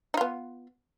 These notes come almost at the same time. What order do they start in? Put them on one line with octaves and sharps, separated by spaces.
D#4 F4 B3